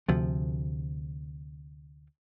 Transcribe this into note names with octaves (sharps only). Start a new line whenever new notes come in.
D2 C3 F3